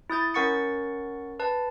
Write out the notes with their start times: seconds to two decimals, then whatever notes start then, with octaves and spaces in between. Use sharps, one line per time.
0.10 E4 D#6 G6 A6
0.34 C#4 A#4 F#5 C#6 A6 C#7
1.40 B4 A5